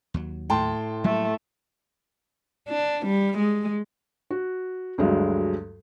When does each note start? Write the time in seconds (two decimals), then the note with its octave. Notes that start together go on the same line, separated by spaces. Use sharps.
0.14 D#2 F#3
0.50 A2 G5 A5 C6
1.04 F#3 G3 A3 A#3
2.69 D4
3.06 G3
3.38 G#3
4.31 F#4
4.98 D2 G2 F#3 G#3